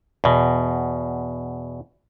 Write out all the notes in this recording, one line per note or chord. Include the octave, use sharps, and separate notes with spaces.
E2 B2